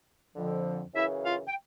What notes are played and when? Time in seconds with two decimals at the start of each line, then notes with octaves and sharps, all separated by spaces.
0.34 F2 D3 F3
0.94 F#2 C#3 E3 E4 E5
1.24 F4 F5
1.47 G5